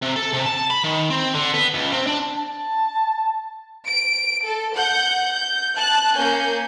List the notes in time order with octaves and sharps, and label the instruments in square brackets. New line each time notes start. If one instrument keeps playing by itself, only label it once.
[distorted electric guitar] C3
A4
C3
A5
B5
D#3
C4
D3
B3
C#2
C4
D4
[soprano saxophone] A5
[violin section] D7
A4
F#5 G6
G6
A5 F#6
A#3 C#4 G#5 G6